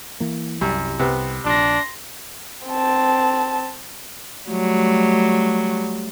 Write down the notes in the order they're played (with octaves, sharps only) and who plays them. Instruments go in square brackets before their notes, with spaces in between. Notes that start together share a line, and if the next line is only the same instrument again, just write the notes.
[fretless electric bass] E3 A#3
[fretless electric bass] C2 G3 [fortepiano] F#2
[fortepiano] C3 B3
[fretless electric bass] A#1 [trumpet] D4 [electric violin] C6 A#6
[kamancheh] C4 A5
[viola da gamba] F#3 G3 A3